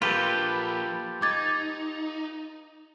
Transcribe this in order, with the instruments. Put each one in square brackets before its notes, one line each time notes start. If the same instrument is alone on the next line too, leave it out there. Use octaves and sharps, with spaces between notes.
[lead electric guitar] F3 A#3 [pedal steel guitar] F4 G4 A4 [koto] B4
[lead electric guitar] D#4 [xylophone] D6 G#6 A6